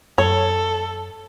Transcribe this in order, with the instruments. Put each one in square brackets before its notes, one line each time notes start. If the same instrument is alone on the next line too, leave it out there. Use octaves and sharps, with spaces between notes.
[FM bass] F#2 [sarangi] A4 [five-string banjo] C#5